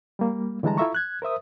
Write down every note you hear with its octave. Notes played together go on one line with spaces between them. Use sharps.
G3 A#3
D3 E3 G3 G#3 A5 A#5
E4 F4 A4 E5 A#5 C#6
F#6 G#6
A#4 C5 E5 D#6